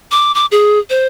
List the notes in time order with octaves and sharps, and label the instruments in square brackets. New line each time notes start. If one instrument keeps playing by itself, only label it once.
[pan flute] D6
D6
G#4
C5